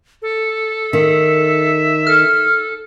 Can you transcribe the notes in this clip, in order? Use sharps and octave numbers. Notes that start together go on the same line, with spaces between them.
A4
D#3 E5
A4 F6